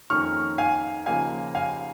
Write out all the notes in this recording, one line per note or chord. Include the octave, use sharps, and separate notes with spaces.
F2 D#3 A#3 C#4 C#6 F6
F5 G#5
D#2 C#3 F3 A#3 D#4 F5 G#5
F5 G#5